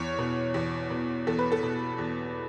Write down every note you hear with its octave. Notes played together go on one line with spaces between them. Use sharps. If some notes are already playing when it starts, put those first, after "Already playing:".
Already playing: E2 C#5
B2
E2
B2
E2 A4
B4
A4
B2
E2